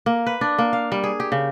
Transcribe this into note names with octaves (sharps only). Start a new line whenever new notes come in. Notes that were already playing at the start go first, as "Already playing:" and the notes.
A#3
B4
D4
A#3
F5
G3
G#4
G4
C#3